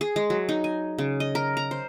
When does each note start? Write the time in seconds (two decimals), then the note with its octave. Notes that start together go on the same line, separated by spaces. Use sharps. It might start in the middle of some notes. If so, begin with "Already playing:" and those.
0.01 G#4
0.16 G#3
0.30 F#3
0.49 D#4
0.64 G#5
0.98 C#3
1.20 D#5
1.35 A#4
1.57 A#5
1.71 C5